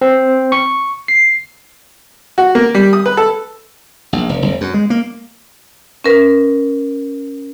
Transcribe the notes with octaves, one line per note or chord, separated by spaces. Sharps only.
C4
C#6
C7
F#4
A#3
G3
D#6
B4
A4
A#1
F1
F1
F#2
G#3
A#3
C#4 A#4 B4